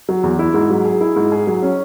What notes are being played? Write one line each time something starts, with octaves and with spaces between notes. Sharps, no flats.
F#3
E2
E4
G#2
F#3
G#4
E4
G#2
G#4
F#3
C#4